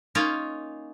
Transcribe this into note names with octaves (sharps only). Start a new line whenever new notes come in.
A#3 C#4 D#4 F4 C#5 F5